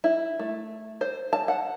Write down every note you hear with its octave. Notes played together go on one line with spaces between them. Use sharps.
E4
A3
C5
A5
F#5